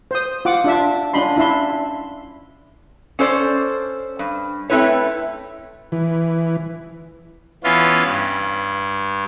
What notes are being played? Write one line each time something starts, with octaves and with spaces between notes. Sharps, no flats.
C5 D#6
F4 F#5 D6
D4 F4 E5
C#4 D4 F4 D#5 B5 C6
D4 E4 E5 C6
C#4 A4 C5 D5
G2
A3 C4 E4 B4 C#5
E3
E3 B3 C#4 F4
G2